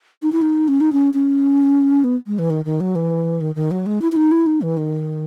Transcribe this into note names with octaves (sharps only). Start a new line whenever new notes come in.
D#4
E4
D#4
C#4
D#4
C#4
C#4
B3
G#3
E3
D#3
D#3
F#3
E3
D#3
D#3
F#3
G#3
E4
E4
D#4
E4
D#4
E3
D#3